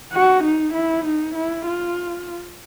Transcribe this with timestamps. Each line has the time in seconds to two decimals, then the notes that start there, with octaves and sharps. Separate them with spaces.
0.13 F#4
0.44 D#4
0.74 E4
1.05 D#4
1.35 E4
1.67 F4